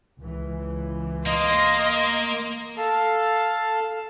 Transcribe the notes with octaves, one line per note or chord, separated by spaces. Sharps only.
C#2 E3
A#3 D#5 C6
A4 F5 A5